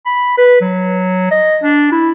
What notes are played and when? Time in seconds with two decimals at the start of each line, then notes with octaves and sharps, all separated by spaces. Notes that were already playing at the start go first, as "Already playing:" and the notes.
0.06 B5
0.38 B4
0.61 F#3
1.31 D#5
1.63 D4
1.92 E4